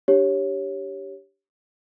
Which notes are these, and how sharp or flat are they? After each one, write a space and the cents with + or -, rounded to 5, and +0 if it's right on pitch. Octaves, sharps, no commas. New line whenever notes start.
D4 +10 G4 +0 C#5 -5